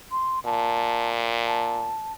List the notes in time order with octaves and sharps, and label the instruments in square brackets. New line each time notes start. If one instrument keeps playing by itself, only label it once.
[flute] C6
[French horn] A#2 [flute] A5
[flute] A5